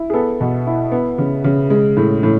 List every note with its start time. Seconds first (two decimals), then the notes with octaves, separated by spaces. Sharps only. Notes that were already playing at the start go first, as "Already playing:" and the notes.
Already playing: E4
0.10 G#4
0.14 B3 A4
0.41 B2
0.67 E4
0.92 B3
1.18 C#3
1.44 C#3
1.70 G#3
1.97 A2
2.23 A2